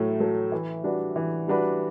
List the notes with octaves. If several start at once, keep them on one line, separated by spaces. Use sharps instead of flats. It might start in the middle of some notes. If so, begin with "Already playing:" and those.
Already playing: A2 F#3 A3
F#3 A3
E3
G3 D4 F#4 B4
E3
G3 D4 F#4 B4